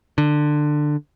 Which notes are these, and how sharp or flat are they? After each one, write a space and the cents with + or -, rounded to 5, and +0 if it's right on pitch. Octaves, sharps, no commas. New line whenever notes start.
D3 +15